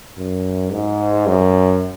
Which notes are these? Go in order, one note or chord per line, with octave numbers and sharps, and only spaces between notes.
F#2
G#2
F#2